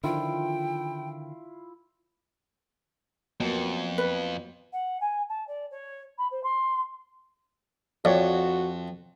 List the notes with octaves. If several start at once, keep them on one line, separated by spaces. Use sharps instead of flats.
D3 D#3 F3 E4 F4 G5
F2 F#3 A#3 B3
B4
F#5
G#5
A5
D5
C#5
B5
C5
C6
F2 F#4 C#5 D5